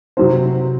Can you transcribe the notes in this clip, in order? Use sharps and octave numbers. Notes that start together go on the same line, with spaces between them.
C3 F#3 C4 C5